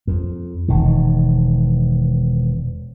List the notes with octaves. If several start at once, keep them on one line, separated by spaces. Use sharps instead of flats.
F2
E1 D#3